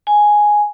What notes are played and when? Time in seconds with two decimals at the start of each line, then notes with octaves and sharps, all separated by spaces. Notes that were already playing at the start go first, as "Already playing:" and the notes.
0.07 G#5